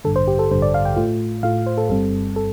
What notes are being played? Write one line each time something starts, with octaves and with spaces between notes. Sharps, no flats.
A1 G2 D3 A4
C5
G4
A4
A1 G2 D3 C5
D5
F5
G5
A2 A3 F4
A2 A3 F4 F5
C5
A4
G1 G2 G3 C4 A4
A4